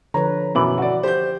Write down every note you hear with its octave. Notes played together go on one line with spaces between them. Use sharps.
D3 F3 B4 C#5 A#5
F#2 B2 E3 D6 F#7
F#4 D5
G4 C5 G6